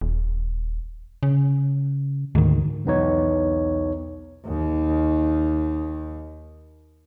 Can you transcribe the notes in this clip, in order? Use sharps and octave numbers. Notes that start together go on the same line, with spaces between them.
D#1
C#3
D2 G#2 D#3
B1 E2 B3 D#4 C#5
D#2 D#3